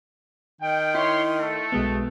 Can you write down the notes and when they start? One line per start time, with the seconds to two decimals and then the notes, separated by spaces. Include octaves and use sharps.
0.61 D#3 G5
0.95 E4 C#5 C6
1.39 A3 A4
1.72 B1 G#3 B3